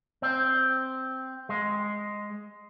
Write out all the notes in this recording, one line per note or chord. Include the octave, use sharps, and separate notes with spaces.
C4
G#3